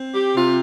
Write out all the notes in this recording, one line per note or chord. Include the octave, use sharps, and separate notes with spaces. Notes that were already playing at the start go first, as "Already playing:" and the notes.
Already playing: C4
G4
C3 F4